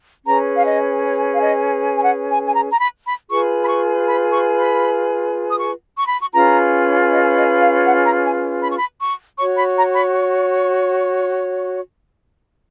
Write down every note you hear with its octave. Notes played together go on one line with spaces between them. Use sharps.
C#4 G#4 B4 A#5
F5
D#5
C#5
F5
D#5
G#5
F#5
G#5
G#5
A#5
A#5
B5
B5
F4 G#4 B4 C#6
B5
C#6
B5
C#6
B5
D#6
C#6
C#6
B5
C#6
C#4 F4 G#4 B4 A#5
D#5
D#5
F5
F#5
A#5
G#5
B5
C#6
B5
C#6
F#4 C#5 C#6
B5
A#5
B5